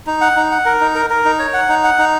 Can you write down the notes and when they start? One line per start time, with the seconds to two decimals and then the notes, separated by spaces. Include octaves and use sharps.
0.07 D#4
0.21 F#5
0.37 D#4
0.52 F#5
0.66 A#4
0.80 D#4
0.95 A#4
1.10 A#4
1.25 D#4
1.39 C#5
1.54 F#5
1.69 D#4
1.84 F#5
1.98 D#4